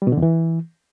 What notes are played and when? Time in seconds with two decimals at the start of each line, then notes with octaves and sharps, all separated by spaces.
0.02 G3
0.07 B2
0.12 D3
0.17 E2
0.22 E3